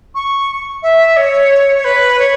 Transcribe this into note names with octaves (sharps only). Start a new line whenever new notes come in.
C#6
E5
C#5
C#5
B4
C#5